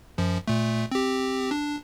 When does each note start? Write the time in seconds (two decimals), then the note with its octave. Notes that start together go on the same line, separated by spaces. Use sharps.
0.18 F#2 F3
0.48 A#2 A3
0.92 C4 G4
1.51 D4